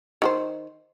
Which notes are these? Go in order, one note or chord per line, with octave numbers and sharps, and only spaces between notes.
D#3 G4 C5